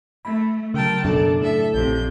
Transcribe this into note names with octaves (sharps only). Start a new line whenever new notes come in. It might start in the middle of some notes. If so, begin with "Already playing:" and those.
A3 B5
C#3 F#3 A#4 G5 A5
F#2 B2 D4 A4
A2 A4 E5
A#1 F2 C3 G6